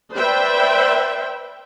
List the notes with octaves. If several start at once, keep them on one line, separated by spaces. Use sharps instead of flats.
B4 C5 D5 E5 G5